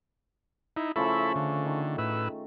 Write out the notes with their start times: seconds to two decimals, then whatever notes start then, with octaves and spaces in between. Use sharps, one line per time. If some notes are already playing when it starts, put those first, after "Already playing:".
0.76 D#4 E4
0.96 C#3 F3 A3 E4 A4 B5
1.36 D3
1.66 D#3
1.98 A2 B4 E6